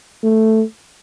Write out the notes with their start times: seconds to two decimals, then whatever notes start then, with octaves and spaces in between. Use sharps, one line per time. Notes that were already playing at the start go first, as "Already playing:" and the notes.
0.24 A3